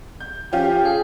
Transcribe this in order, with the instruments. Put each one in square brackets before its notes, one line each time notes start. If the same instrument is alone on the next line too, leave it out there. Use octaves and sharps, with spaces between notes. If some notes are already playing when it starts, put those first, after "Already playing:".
[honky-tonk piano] G6
[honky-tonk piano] F3 C#4 F4 [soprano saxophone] G4
[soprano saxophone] G#4